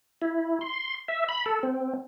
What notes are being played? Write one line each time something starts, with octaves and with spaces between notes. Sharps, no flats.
E4
C6
E5
B5
A4
C4